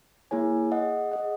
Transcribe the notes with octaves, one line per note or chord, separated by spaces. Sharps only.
A#3 E4 G#4 C#5 G#5
G#4 D#5 F#5
G#4 D#5 F#5